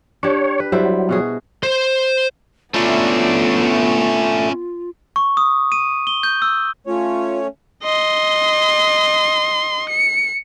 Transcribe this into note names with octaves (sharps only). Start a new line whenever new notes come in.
D4 G4 C#5
B4
F#3 G3 E4 C5
B2 F#4 G#4
C5 C6
A3 B3 C#4 D4 E4 F4
C#6
D#6
D#7
G7
G6
E6
A3 C#4 F4 C#5
D#5 C6
C#7